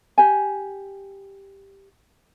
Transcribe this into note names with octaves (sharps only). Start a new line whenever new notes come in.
G4 G#5